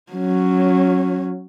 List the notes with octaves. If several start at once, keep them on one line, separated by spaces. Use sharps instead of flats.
F#3 C#4